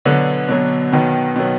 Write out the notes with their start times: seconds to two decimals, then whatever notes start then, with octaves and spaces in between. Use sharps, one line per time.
0.05 B2 D3 F#3 B3
0.49 B2 F#3 B3
0.92 B2 D#3 F#3 B3
1.35 B2 F#3 B3